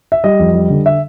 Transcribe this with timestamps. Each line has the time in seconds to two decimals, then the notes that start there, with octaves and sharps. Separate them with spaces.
0.12 E5
0.24 G3 D#5
0.39 F2
0.54 G3
0.70 D3
0.86 E5